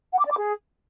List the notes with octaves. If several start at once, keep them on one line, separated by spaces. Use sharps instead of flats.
F#5
D6
D5
D6
G#4